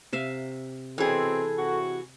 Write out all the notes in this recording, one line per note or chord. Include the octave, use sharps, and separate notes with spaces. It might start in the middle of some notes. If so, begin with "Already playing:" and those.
C3 E5 F5
B2 E3 C4 G#4 A4
C3 F#4